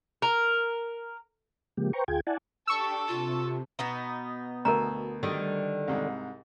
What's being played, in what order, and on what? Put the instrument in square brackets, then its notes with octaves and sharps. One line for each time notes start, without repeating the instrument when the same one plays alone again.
[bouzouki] A#4
[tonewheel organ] C#3 F3 G#3 A#3 G4
B4 C5 G5 A#5 C#6
D2 F4 G#4 G5 G#6
E4 D5 F#5 G#5 A5
[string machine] D4 G4 G5 [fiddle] A4 A5 [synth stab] C#6 E6
[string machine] C3 [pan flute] F4
[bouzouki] B2 B3 D#4
[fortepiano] D2 [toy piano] A#4 A#5
[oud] D3 D#3 G3
[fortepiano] C2 G#2